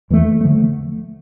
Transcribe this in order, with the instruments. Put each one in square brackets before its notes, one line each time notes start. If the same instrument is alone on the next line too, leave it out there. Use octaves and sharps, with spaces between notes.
[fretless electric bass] E2 E3 A3
D3 F3 A3